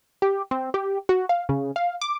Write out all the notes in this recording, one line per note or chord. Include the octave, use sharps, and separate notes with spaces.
G4
C4
G4
F#4
F5
C#3
F5
D6